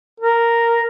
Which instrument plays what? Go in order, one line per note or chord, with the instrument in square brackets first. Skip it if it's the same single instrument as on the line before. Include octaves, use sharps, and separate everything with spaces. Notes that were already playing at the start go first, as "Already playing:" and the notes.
[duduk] A#4